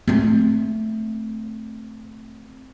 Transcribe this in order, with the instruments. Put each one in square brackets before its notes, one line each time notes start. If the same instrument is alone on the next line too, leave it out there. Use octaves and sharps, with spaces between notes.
[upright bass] A3 C4